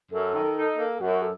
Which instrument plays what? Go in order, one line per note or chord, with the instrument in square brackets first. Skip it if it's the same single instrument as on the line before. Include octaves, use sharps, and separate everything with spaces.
[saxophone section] F#2 [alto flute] A4
[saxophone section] D#3
D#4
A#3
[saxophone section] F#2 [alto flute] F#4
[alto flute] A4